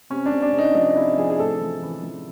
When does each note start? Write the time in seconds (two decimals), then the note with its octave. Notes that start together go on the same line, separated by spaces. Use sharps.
0.10 C3 C#4
0.26 D4
0.32 C3
0.42 D4
0.53 C3
0.58 D#4
0.75 F3 D#4
0.96 C3 E4
1.17 F3 G#4
1.30 G#4
1.39 A2 A4
1.60 E3
1.82 E3
2.03 E3